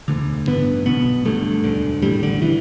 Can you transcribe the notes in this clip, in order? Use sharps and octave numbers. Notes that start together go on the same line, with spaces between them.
E1 D2 D3
A1 G2 D3 B3
B1 B2 B3
G1 G2 D3 A3
E1 D2 D3
A1 A2 G3
D3
D3 E3